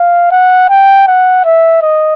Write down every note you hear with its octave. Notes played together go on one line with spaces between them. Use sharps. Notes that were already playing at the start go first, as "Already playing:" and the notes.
Already playing: F5
F#5
G5
F#5
E5
D#5